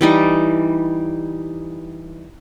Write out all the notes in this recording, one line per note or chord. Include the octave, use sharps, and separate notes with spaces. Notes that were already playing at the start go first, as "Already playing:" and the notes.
E3 G3 D#4